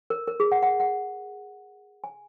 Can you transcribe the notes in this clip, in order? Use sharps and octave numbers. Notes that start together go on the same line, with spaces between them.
A#4
A#4
G#4
F#5
F#5
F#5
G#5